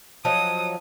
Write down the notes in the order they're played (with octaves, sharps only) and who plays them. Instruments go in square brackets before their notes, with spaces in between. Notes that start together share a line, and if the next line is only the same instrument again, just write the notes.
[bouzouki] F3 F#3 D#4 [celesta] A5 [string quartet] D#6